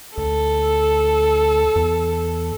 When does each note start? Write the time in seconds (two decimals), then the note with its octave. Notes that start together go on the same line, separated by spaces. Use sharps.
0.18 D2 A4
1.76 E2